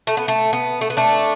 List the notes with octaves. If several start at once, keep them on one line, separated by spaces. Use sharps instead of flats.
A3
B3
A3
B3
A3
B3
A3 D4